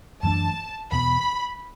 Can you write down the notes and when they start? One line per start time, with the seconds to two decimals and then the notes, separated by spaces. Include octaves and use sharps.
0.23 F#2 E3 A3 D4 A5
0.91 E2 B2 B3 B5